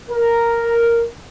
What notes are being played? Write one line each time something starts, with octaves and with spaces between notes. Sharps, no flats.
A#4